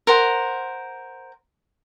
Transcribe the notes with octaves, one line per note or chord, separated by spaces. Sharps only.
A#4 C5 F#5